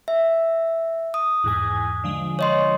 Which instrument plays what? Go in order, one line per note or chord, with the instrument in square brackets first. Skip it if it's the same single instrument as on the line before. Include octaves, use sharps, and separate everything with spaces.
[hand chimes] E5
D#6
[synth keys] E2 G#2 G#5
D3 F3 G#3
[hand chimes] C#5 D#5 C6